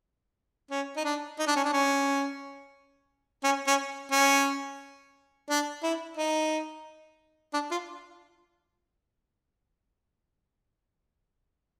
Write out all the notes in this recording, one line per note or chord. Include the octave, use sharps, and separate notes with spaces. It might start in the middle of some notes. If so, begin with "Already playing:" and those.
C#4
D#4
D4
D#4
D4
C#4
D4
C#4
C#4
C#4
C#4
D4
E4
D#4
D4
F4